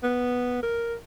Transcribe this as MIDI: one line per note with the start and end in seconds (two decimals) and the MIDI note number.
0.03 0.61 59
0.63 0.94 70